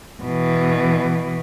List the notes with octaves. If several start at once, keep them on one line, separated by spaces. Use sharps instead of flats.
B2 E3